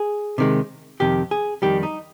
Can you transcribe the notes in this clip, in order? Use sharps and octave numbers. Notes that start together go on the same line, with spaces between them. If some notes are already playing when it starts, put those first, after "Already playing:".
Already playing: G#4
C3 D#3 G#3
F2 C3 D#3 G4
G#4
F2 D#3 G3 G4
D#4